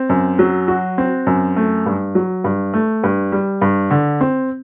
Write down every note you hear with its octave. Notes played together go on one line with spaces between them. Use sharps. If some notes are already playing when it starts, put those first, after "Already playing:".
Already playing: C4
F#2
F#3
F#4
C4
F#2
A3
G2
F#3
G2
A3
G2
G3
G2
D3
C4